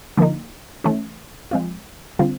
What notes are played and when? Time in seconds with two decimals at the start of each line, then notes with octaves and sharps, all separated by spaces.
0.17 D3 F3 A#3 D#4
0.84 E3 A3 C#4
1.51 F3 G#3 C4 F4
2.19 D3 G3 C4 F4